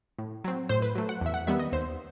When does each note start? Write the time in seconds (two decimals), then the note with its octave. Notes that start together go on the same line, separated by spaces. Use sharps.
0.19 A2
0.44 F#3 C4
0.69 A2 C5
0.82 B4
0.95 F#3 A3
1.09 F#5
1.21 E2 E5
1.34 F#5
1.47 D#3 G3 B3 E5
1.59 D#5
1.73 D#2 C5